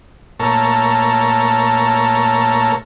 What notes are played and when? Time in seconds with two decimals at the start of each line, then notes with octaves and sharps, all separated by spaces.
0.40 A#2 A3 A4 A#4 C#5